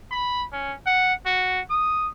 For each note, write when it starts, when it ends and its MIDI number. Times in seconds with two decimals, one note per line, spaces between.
0.11 0.44 83
0.53 0.74 61
0.86 1.13 78
1.26 1.60 66
1.70 2.08 87